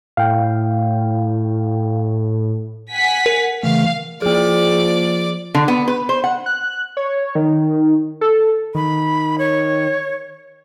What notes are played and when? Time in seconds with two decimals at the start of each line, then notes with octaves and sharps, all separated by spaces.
0.17 A2 F5 G5
2.92 F#5 G#5 B6
3.26 A#4
3.63 C#3 E3 A3 F5
4.22 F3 A#3 G#4 D5
5.55 D3
5.68 B3
5.88 B4
6.09 C5
6.24 F#5
6.46 F#6
6.97 C#5
7.35 D#3
8.21 A4
8.75 D#3 B5
9.39 C#5